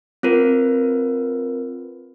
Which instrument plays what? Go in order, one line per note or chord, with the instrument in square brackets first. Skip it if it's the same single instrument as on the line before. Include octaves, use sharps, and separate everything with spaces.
[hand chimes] C4 F4 A#4 B4